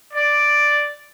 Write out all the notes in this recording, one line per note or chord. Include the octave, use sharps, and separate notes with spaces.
D5